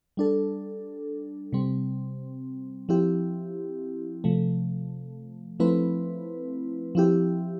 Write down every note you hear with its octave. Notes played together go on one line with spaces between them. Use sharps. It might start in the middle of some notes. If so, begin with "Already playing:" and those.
G3 D4 A4
C3 G3 C4
F3 C4 E4 G4
C3 F3 A3
F3 A3 C4 E4 B4
F3 C4 E4 G4